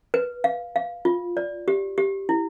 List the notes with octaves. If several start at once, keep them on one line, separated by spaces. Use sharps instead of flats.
B4
F5
F5
F4
D5
G4
G4
E4